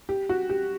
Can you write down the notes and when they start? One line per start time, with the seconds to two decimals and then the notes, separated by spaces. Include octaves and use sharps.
0.09 G4
0.29 F#4
0.50 G4